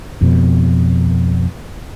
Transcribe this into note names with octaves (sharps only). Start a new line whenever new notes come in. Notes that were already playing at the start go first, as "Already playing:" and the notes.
F2 B2